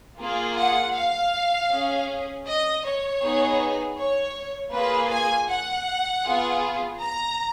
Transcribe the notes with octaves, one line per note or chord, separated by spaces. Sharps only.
A#3 F4 G#4
F#5
F5
C#4 G#4
D#5
C#5
B3 D#4 G#4
C#5
A#3 F4 G#4 B4
G#5
F#5
B3 F4 G#4
A#5